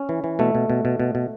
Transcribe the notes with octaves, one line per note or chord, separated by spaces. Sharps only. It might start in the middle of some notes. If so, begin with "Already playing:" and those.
Already playing: C#4
E3
E3
B2 A3
B2
B2
B2
B2
B2